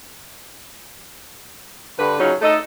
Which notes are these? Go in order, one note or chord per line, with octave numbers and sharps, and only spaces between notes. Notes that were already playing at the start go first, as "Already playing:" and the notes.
G2 D3 B4
C#3 F#3 C#4 D#4 F4
A3 D#4 A4 D#5